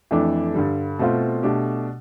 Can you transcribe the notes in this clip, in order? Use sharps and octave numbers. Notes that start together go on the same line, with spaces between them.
F2 E3 A3 D4
G2 D3 G3
B2 A3 C4 F4
B2 A3 D4 G4